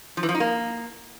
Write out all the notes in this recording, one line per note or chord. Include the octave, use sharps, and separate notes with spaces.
F3
E3
F3
D#4
A#3